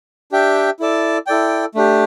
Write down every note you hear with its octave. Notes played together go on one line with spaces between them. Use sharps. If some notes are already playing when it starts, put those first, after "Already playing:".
D4 G4 E5 G5
E4 A4 D5 A5
E4 A4 D5 G5
A3 D4 G4